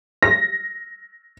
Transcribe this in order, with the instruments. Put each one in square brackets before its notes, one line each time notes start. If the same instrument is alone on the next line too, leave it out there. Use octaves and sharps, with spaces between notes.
[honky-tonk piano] A#6